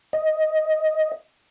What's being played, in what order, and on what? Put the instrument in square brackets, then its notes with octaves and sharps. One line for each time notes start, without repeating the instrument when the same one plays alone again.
[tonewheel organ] D#5